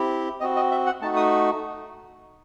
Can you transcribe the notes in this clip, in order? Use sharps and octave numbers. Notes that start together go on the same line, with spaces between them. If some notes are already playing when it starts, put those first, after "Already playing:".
Already playing: C4 E4 G4
C4 F#4 D#5
D#5
E5
F#5
A3 D#4 F#4 A5
D#6